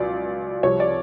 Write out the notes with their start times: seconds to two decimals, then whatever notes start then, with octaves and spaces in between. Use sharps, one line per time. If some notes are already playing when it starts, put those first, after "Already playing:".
Already playing: C#2 B2 F#3 D5
0.63 C2 C3 F3 C#5
0.80 D5